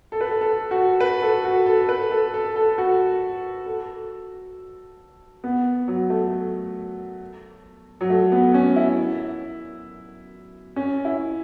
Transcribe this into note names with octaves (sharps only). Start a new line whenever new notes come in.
A4
B4
A4
A4
F#4
B4
A4
F#4
A4
B4
A4
A4
A4
F#4
A4
B3
F#3
A3
F#3
A3
B3
C#4
E4
C#4
E4